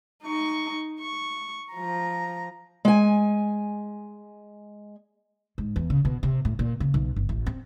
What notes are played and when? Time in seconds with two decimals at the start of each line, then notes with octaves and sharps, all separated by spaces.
0.23 D#4 C#6
1.00 C#6
1.73 F3 A#5
2.85 G#3 G#5
5.58 G#2
5.76 E2
5.90 C#3
6.05 B2
6.23 C3
6.45 A2
6.59 A#2
6.80 C#3
6.94 B1
7.16 G1
7.29 A1
7.47 C4